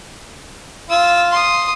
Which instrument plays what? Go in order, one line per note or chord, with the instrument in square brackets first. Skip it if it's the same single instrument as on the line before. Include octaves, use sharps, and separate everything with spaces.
[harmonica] F4 [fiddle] E6
[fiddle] C6 D#6